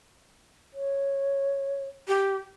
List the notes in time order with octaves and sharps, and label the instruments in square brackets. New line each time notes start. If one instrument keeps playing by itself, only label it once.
[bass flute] C#5
[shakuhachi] G4